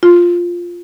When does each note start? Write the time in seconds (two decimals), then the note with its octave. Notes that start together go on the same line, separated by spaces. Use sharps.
0.03 F4